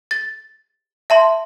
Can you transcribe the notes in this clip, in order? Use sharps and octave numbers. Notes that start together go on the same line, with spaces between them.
A6
E5 A5 C6